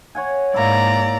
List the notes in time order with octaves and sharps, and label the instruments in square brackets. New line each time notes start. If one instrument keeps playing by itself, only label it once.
[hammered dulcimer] C#5 F#5 G#5
[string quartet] G#2 D5 A#5 [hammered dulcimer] A#3 E4